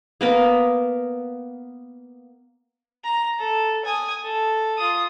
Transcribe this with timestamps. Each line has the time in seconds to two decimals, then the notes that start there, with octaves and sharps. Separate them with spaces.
0.21 A#3 B3 A#4
3.04 A#5
3.39 A4
3.85 G#5 D#6
4.24 A4
4.78 F4 D#6